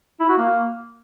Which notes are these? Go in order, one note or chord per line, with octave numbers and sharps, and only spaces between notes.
E4
F#4
A#3